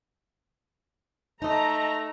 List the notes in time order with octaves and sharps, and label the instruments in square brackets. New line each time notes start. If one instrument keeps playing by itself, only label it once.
[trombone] A3 [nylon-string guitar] D#4 D#5 [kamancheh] A5 [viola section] A#5